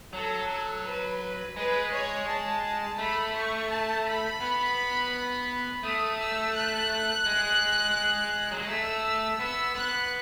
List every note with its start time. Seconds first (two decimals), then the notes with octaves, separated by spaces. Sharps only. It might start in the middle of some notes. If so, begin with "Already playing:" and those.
0.13 F#3 A4
0.49 A4
0.85 B4
1.56 G#3 B4
1.92 C#5
2.28 A5
2.98 A3 B5
3.35 C#6
3.69 A5
4.06 B5
4.40 B3
5.83 A3 D#6
6.19 E6
6.55 F#6
7.26 G#3
8.51 F#3
8.59 G#3
8.68 A3 E6
9.39 B3 E6
9.75 B3 F#6